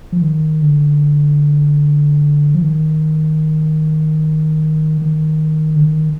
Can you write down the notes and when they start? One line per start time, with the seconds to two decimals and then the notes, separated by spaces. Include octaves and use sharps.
0.12 F3
0.22 D#3
0.62 D3
2.55 F3
2.62 D#3
5.02 D#3
5.76 D3
5.81 D#3